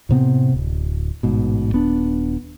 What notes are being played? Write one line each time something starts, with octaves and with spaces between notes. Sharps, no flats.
A2 C3 B3 C4
D1
A1 G#2 B2
D#1 B3 D4